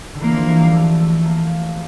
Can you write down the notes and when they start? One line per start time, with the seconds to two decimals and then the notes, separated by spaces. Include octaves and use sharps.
0.14 D3
0.21 E3 A#3
0.34 F3
0.47 E3
0.60 G3
0.74 A3
1.00 A3
1.26 A#3